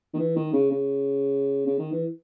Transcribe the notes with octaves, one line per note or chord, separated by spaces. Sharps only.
D#3
E3
D#3
C#3
C#3
C#3
D#3
E3